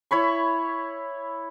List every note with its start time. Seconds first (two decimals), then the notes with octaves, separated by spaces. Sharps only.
0.11 E4 C#5 B5 C#6